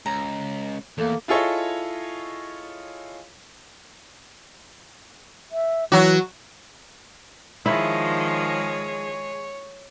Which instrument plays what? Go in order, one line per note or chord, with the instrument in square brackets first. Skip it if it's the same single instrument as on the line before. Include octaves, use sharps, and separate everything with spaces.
[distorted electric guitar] C#2 [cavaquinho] A#5
[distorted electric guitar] E2 [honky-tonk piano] A3 [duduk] A#3
[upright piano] E4 F4 G#4 A4 C#5 D#5
[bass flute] E5
[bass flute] E3 [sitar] F#3 F#4
[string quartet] D#3 F3 [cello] G#3 G#4 [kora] E4 [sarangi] C#5